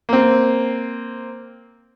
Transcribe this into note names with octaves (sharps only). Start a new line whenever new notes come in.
A#3 C4